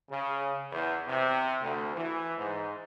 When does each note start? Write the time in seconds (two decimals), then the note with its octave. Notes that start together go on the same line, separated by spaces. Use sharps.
0.10 C#3
0.72 E2
1.08 C3
1.61 D2
1.96 E3
2.38 G#2